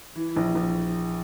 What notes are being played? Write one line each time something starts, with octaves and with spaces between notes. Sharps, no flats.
E3
A#1
A#1